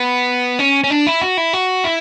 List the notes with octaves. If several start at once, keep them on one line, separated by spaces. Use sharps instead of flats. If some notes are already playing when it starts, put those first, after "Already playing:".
Already playing: B3
C#4
C#4
D4
E4
F#4
E4
F#4
E4